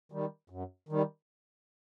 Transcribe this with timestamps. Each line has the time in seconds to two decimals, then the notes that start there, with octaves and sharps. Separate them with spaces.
0.12 D#3 G3
0.50 F#2
0.89 D#3 G3